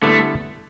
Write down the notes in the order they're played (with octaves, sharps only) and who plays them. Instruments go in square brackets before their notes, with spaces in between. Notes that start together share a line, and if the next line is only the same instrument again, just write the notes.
[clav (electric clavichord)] D3 G3 B3 E4 A4 [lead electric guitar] A3